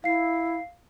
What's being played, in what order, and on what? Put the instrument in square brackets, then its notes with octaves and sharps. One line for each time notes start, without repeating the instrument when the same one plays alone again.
[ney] E4 [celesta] F5 C7